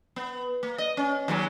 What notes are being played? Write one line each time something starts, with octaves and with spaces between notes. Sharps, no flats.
B3
A#3
D#5
C#4
D#2 F#3 G#3